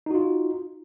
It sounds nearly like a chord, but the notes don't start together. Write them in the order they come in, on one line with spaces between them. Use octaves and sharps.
D#4 F#4 F4